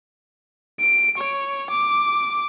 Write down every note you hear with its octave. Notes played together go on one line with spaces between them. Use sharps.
D7
C#5
D6